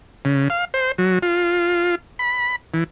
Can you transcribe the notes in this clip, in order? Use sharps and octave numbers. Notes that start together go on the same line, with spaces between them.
C#3
F5
C5
F#3
F4
B5
E3